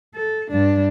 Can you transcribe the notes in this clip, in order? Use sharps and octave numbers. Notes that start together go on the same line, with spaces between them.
A4
G2 D4